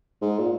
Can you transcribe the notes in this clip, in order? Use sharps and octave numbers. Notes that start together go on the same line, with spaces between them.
G#2
A#2